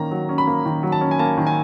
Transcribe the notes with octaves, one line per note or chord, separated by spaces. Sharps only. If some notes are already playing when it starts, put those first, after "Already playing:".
Already playing: D#3 A#3 C#4 A#5
F#3
C#4
B5
A#3
D#3
F#3
A5
C#4
G#5
A#3 A5
D#3
G#5